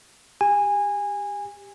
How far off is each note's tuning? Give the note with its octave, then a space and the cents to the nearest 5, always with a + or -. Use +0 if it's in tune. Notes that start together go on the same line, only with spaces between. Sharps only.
G4 +15 G#5 -20